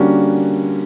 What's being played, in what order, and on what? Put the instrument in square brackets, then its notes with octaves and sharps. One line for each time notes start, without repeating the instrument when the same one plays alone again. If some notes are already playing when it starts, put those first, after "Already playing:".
Already playing: [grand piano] D3 G3 A#3 C#4 F#4